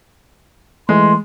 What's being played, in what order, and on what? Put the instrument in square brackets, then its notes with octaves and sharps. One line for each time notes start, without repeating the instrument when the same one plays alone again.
[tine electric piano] E3 A3 [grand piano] G#3 [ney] C6